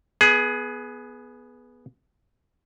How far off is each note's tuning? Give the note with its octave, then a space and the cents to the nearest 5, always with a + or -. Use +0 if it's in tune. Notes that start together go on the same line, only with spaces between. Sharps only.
B3 -5 G#4 +15